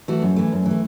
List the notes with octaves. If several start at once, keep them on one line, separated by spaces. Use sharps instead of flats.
E3 A3 F#4
F#2
E3 A3
F#2
E3 A3